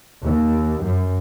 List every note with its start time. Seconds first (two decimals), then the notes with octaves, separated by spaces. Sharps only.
0.24 D#2
0.84 F#2